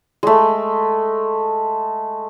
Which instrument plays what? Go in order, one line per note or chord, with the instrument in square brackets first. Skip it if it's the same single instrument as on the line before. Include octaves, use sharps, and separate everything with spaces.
[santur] G#3 A3